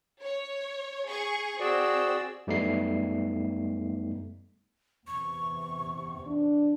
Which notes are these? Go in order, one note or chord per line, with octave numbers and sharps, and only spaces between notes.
C#5
G#4 C#6
C4 F#4 G#4 D5 E6
F#2 G3 A3 B3 D#4 C7
E2 C3 C#6
D4